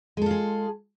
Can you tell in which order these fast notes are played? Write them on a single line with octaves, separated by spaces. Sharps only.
G#3 A4 F4 G#4